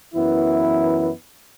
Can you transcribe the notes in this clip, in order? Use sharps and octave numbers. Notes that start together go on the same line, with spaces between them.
F#2 E3 B3 E4